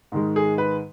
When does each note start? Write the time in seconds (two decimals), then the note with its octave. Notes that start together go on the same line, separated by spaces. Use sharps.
0.12 G#2 D#3 G#3
0.36 G#4
0.58 B4